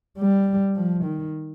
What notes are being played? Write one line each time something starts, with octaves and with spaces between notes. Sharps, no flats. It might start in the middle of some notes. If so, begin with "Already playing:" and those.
G3
F3
D#3